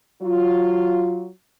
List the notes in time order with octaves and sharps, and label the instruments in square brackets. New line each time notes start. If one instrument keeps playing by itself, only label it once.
[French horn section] F#3 F4